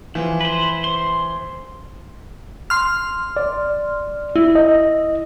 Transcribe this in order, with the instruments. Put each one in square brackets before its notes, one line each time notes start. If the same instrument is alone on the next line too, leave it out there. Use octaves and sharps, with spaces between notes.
[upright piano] E3 [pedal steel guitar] F3
[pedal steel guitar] B4 C5
C5 C6
[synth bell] C6 F6
[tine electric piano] D5
[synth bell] E4
[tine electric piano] D#5